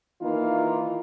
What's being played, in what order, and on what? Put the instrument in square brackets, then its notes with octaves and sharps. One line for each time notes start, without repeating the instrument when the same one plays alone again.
[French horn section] D#3 E3 A#3 D#4 F4